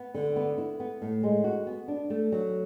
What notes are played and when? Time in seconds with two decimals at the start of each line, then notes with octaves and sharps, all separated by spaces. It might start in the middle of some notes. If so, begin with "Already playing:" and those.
Already playing: B3
0.14 D3
0.36 B3
0.58 E4
0.80 B3
1.02 A2
1.23 G#3
1.44 F#4
1.67 B3
1.88 D4
2.10 A3
2.32 F#3